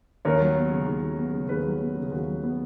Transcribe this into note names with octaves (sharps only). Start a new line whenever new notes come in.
D#2 A#4 C#5
F#3
B3
C#3
D#2
F#3
B3
C#3
D#2 G#4 B4
F#3
B3
C#3
G#4
D#2 F#4
F#3
B3